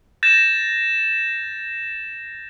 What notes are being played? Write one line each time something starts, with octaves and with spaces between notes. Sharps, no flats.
G6 A6 A#6 E7